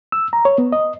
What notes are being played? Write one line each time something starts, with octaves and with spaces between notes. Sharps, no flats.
E6
A#5
C#5
B3
D#5